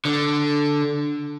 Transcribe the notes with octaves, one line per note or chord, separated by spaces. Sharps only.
D3